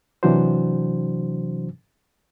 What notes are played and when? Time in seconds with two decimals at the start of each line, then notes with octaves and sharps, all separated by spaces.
0.23 C3 E3 F#3 D4 F#4 C5